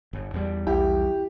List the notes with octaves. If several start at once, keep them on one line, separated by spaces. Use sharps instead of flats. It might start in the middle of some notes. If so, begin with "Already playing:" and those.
G1
E2 G3
B1 E4 G4